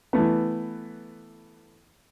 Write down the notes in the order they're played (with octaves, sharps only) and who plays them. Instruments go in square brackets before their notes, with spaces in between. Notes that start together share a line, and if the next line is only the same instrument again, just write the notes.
[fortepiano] E3 A3 B3